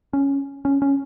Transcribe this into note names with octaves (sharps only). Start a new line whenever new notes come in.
C#4
C#4
C#4